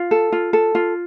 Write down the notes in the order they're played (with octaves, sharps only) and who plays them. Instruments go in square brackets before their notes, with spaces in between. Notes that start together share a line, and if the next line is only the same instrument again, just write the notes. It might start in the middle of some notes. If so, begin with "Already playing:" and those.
Already playing: [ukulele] F4
A4
F4
A4
F4